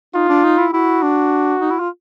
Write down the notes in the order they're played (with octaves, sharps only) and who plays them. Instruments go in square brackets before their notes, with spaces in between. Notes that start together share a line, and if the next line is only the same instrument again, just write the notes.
[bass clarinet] D#4 [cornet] F4
[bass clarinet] D4
D#4
E4
[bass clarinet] E4 [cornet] F#4
[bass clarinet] D4
D#4
E4
F4